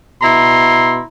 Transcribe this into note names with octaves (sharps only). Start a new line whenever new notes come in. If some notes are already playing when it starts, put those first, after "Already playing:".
B2 E4 A#5 C6